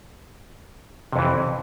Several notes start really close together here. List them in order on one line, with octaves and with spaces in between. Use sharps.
C3 F2 E3